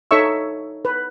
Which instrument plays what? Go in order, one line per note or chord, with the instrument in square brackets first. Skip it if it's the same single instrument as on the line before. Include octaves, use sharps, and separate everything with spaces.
[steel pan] D#4 A4 C#5 E5 C#6 E6
B4